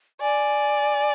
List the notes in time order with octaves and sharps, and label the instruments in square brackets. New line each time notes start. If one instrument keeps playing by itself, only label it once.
[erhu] D5 [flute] G#5